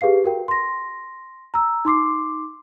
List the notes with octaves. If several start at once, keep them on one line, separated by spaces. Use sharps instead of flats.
G4 G#4 B4 F5 C7
F#4 A#4 G5
C6 A#6
A#5 E6
D#4 C6 D6 C7